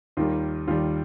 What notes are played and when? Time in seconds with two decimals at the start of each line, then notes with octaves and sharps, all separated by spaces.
0.17 D#2 D#3 G3 F4
0.67 D#2 D#3 G3 F4